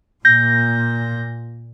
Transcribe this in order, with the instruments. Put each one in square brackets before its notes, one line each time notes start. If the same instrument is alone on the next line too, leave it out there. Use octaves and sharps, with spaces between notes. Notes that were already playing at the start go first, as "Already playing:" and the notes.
[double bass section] A#2 [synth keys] G6 A#6